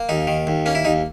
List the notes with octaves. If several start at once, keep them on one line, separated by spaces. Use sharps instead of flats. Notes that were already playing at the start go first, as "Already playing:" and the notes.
Already playing: A#3
D#2 D#4
D#3
D#2
A#3 C#4
E4
D#2 D#4